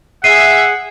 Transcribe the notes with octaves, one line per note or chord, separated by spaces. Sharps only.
G#4 E5 F#5 C7 D#7